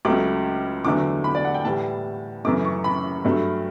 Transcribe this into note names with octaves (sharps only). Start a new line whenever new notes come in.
C#2 C#3 F#3 A3 D6
E2 D3 F#3 A3 D6
B5
D5
F#5
G5
A2 E3 G3 A5
F#2 C#3 E3 A3 D6
C#6
B5
G2 F#3 A3